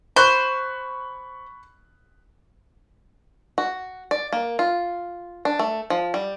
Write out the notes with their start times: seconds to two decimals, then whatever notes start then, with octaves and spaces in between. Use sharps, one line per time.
0.16 C5 B5 C#6 F#6
3.58 F#4
4.11 D5
4.33 A#3
4.59 F4
5.45 D4
5.59 A3
5.90 F3
6.14 G3